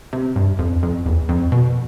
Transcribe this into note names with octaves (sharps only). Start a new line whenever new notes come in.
C3
G2
F2
F2
E2
F2
B2